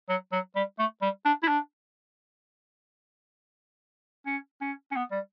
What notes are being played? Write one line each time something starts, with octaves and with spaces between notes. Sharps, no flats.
F#3
F#3
G3
A3
G3
D4
E4
D4
C#4
C#4
C#4
B3
G3